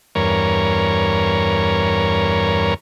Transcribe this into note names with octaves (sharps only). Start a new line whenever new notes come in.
E2 G2 A#4 C#5